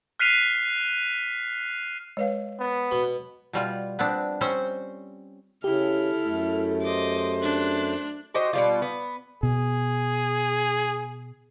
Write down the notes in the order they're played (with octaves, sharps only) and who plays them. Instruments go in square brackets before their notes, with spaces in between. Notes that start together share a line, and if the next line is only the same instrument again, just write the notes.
[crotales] F6 F#6 B6 C7 D#7 F7
[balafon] G#3 B4 F5 [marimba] C#5
[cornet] B3
[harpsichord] B2
[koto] B2 G3 F4
B3 C4 D4
G3 C4 C#4 C5
[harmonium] C#3 [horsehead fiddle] E4 A4 [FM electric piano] G4 [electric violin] F6
[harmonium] F#2 A3
[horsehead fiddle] C5 [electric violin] D#5 D6
[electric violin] D4 F#6
[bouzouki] F#4 G4 C5 D#5
B2 G3 F4
B3
[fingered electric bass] B2 [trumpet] G#4